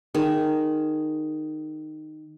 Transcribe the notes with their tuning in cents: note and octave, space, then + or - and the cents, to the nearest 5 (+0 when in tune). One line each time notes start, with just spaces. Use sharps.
D#3 -10 G#4 +0